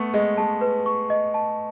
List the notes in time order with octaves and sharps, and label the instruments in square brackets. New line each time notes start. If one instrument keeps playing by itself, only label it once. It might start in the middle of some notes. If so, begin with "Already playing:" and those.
Already playing: [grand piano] A3 B3 [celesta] B4 C#6
[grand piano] G#3 [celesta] D#5
[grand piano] G#3 [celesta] A5
[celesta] B4
C#6
D#5
A5